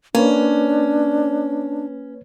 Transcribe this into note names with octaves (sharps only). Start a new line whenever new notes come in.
A#3 C#4 D4 B4 C#5